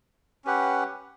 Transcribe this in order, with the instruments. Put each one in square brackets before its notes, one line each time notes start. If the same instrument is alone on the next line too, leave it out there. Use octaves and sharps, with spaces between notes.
[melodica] C#4 G4 B4 F#5